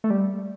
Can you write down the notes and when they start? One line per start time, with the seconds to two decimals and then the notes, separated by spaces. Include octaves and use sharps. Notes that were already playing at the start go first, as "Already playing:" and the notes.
0.04 A3
0.10 G3